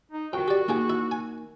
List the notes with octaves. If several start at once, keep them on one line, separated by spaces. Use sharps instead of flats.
D#4
F2 F#4 A#4 G5
G4 D5
A#3 D#4 F4 G#4 G5
E4
G#5